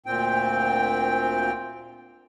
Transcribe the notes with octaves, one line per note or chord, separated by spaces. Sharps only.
D2 A#2 C4 G5